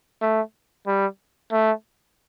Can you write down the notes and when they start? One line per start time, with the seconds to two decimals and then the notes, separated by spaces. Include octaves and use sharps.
0.22 A3
0.86 G3
1.52 A3